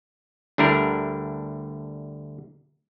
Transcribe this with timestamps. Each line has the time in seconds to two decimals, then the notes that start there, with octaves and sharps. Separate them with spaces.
0.58 D2 D3 G3 D4 E4 A#4